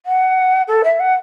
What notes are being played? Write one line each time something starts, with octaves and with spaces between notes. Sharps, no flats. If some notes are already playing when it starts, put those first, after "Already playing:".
F#5
A4
E5
F#5